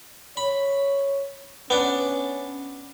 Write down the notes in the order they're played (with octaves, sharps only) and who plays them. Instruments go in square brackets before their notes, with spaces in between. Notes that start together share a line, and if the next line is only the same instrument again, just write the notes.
[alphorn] C#5 [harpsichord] B5
[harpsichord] B3 D4 [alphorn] C#4